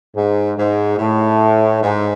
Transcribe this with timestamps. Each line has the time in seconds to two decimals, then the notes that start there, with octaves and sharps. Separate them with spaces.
0.15 G#2
0.57 G#2
0.98 A2
1.83 G#2